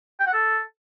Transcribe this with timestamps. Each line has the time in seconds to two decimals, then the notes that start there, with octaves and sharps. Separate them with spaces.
0.20 G5
0.27 F#5
0.34 A4